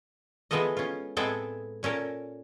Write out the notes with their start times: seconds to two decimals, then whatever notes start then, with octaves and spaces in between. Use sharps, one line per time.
0.51 E3 G#3 B3 F4 A4 D#5
0.77 C#4 F4
1.17 A2 G#3 B3 C4 G#4 A4
1.83 A#2 C#4 A4 A#4